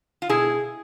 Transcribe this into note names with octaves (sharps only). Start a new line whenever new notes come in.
F4
B2 E4 G#4